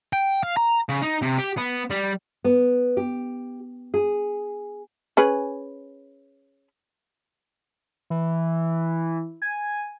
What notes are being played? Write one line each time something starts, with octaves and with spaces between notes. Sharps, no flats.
G5
F5
A#5
C#3
D#4
C3
G4
B3
G3
B3
G4
G#4
C#4 G#4 B4
E3
G#5